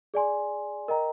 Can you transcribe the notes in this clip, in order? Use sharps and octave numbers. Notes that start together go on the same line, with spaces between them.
G#4 D5 G#5 C6
A#4 D#5 G5 A#5